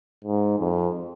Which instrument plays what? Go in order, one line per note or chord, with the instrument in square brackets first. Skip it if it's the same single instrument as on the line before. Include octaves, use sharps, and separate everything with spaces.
[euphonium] G#2
F2